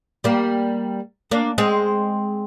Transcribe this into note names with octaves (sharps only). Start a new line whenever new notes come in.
G3 A#3
A#3 D4
G#3 C4